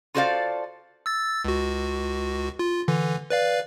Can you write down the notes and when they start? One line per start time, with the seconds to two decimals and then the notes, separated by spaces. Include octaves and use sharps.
0.15 F4 F#4 A4 C5 D5 F5
1.06 E6 A6
1.45 C#2 F#4
2.59 F4
2.88 D3 E3
3.30 B4 D5 F5